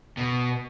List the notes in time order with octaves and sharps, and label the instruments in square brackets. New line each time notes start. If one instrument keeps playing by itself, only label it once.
[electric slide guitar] B2